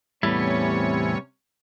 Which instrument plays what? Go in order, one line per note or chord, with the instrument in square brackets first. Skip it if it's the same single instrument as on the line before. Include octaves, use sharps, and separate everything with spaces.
[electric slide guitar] E2 A2 E4 [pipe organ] C3 C#4 C#5 [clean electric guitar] G3 B3